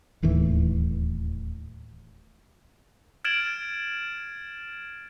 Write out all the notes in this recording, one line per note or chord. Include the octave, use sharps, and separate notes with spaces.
D1 D#2 A2 E3
F6 G#6 A6 D7 E7 F#7